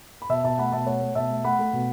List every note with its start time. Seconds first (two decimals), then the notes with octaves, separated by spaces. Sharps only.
0.22 B5
0.29 B2 E5 A5
0.44 B2 E5 A5
0.58 A3 F#5 B5
0.72 B2 E5 A5
0.86 A3 C#5 F#5
1.01 A3
1.15 B2 E5 A5
1.31 A3
1.44 A3 F#5 B5
1.59 A3
1.73 B2